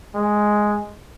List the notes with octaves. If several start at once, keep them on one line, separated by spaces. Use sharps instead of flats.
G#3